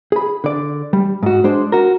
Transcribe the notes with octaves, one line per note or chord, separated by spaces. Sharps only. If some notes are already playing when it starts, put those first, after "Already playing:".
G#4 B5
D3 D5
G3
G#2 F#4
G#3 D4 C5
F#4 A#4